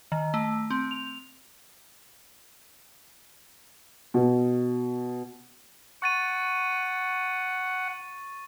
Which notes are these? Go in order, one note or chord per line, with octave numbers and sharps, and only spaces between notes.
D#3
A3
C4
F7
B2
F#5 C#6 A6 D#7